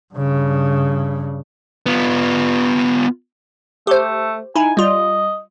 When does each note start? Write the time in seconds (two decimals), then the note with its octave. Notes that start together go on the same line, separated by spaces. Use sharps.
0.14 G2 C#3
1.86 B3 F4
3.87 A3 G4 C5
4.56 D#4 E4 G#5
4.77 G3 F4 D#5